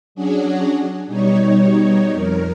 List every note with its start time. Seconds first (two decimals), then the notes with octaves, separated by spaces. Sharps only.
0.15 F#3 C#4 D4 F#4 G#4
1.07 B2 G3 D#4 C#5
2.13 F2 A#4